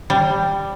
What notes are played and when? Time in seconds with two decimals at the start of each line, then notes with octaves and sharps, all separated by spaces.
0.10 G3